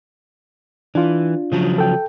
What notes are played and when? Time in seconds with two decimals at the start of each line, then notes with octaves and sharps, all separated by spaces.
0.95 E3 D4 F4
1.52 C#3 F3 F#3
1.78 A4 G5